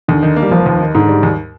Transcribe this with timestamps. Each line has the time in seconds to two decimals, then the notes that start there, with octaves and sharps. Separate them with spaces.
0.08 D#2 D3
0.23 D#3
0.36 A#3
0.43 G3
0.51 F1 F3
0.66 D#2
0.81 D#3
0.94 G#2 D3
1.08 G3
1.23 D#2